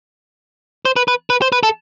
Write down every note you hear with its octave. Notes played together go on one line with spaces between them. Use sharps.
C5
B4
B4
B4
C5
B4
A4